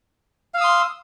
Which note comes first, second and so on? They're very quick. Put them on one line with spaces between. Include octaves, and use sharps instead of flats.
F5 E6 D#6 C6